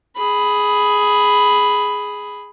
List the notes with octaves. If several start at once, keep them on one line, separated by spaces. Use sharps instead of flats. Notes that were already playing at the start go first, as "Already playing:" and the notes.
G#4 B5